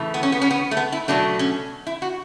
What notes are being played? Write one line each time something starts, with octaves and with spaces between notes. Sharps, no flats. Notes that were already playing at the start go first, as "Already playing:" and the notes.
Already playing: C#3 E3 A3
B3
C#4
B3
C#4
B3
A3
B3
E4
B2 F#3 A3 D4
C#4
E4
F#4